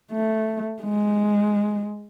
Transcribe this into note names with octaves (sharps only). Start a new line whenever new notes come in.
A3
G#3